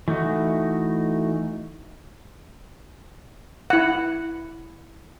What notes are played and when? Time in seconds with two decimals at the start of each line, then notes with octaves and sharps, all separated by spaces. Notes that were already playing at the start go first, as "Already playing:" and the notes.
0.08 E3 A3 D#4 F#4
3.70 E4 F#5